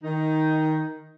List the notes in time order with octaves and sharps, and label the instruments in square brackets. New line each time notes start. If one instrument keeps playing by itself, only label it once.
[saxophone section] D#3 D#4